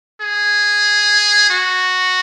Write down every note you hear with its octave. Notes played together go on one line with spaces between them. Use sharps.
G#4
F#4